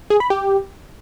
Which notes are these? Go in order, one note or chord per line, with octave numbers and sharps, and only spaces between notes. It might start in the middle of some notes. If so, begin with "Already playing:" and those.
G#4
B5
G4